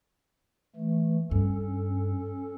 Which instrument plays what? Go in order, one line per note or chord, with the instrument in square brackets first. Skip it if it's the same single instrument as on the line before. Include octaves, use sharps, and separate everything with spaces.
[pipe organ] E3 A3
[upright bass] G2 [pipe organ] C#4 A4